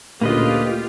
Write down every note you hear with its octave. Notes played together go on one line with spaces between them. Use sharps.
D2 A#2 A#3 C#4 F4 G4 B4 D#5